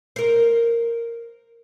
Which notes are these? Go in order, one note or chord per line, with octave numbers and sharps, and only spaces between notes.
A#4 C5